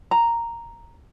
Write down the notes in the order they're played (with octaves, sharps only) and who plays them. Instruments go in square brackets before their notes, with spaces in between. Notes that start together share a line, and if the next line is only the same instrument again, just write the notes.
[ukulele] A#5